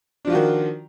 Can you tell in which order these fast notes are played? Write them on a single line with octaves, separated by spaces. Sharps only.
D4 F3 F4 F#4 D#3